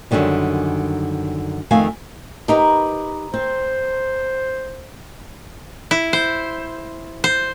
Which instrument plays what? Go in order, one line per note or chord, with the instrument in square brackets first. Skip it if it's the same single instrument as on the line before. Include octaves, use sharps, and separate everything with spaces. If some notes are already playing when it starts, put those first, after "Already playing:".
[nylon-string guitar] F#2 A2 D3 D#3 G3
F2 D#3 A3 F5 G#5
[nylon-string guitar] D#4 G4 [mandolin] A#4 B4
[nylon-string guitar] C4 [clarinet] C5
[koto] E4
C5
C5